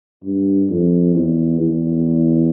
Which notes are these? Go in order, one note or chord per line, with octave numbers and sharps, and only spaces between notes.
G2
F2
E2
E2